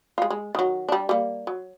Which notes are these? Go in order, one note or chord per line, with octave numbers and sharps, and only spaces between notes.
G#3 F4
G#3
D#3 F#3
G3 D4
G3 A#3
F#3